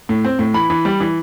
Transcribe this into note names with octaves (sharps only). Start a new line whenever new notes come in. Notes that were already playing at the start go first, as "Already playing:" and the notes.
A2
C4
A2
E3 B5
E3
G3
E3